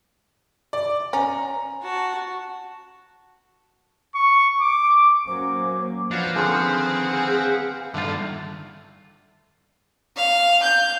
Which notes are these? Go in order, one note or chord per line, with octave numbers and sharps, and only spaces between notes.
D5
C#4 A#5
F#4 A5
C#6
D6
F#3 A#3 C#4 C5 D6
F3 D4 F#4 B4 C#5 F5 F#5
D3 D#3 F3 C4 G#4
G2 D3 D#3 A3 F4
F5
G6